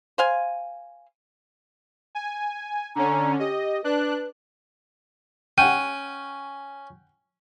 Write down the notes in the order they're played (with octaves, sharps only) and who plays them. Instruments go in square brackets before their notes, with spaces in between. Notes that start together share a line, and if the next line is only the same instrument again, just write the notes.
[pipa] C5 F5 G#5
[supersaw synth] G#5
[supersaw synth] D3 C#4 [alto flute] A#5
[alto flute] G4 [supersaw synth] D#5
[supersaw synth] D4 F#6 [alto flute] B4
[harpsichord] C#4 [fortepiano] F#5 G5 [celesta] D#7